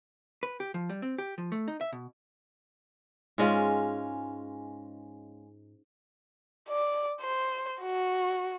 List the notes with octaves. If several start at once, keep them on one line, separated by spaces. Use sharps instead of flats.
B4
G4
F3
G3
C4
G4
F3
A3
D#4
E5
B2
G#2 G#3 C#4 F4
D5
C5
F#4